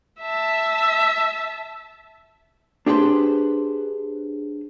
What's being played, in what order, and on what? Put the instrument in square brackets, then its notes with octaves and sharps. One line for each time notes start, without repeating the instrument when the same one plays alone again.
[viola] E5 A5
[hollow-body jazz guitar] D4 G4 G#4 B4 C5